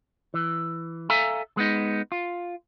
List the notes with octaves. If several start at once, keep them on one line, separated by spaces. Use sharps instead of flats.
E3
A4 E5 F5 G#5 A#5
G#3 B3 D#4
F4